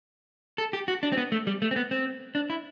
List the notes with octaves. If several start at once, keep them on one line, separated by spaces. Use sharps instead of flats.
A4
G4
F#4
D4
C4
B3
A3
G3
A3
C4
B3
C4
D4
E4